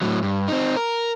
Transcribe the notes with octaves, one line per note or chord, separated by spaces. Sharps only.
A2 F#3
G2
C4 D#4
A#4